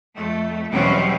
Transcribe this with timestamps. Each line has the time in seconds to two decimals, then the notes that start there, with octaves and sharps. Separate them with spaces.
0.16 F2 A3
0.72 E2 B2 F#3 G3 C4 C#4